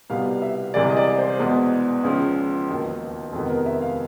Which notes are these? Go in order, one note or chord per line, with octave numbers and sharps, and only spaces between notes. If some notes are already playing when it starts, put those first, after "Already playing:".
C2 B2 G3 B3 F5
E5
C2 C3 E3 G#3 D5
D#5
D5
C5
E2 B2 G#3 B3
C#2 C#3 F3
E1 D#2 D#3
F2 C3 D#3 G#3 B3 A4
A#4
E5
F5